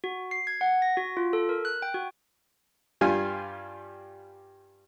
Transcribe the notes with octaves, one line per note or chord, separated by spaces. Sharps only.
F#4
C7
G#6
F#5
A#6
F#4
F4
A4
A#4
F#6
G5
F#4
G2 G3 F4 G#5